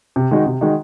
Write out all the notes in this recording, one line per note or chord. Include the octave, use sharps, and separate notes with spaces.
C3
D#3 G#3 D#4 F#4
C3
D#3 G#3 D#4 F#4